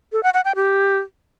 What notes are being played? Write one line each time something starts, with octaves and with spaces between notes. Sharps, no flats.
A4
F#5
F#5
G5
G4